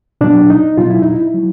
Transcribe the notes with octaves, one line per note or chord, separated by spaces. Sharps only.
B2 F#3 D4
D#4
B2 F#3 F4
E4
D#4
E4
F#3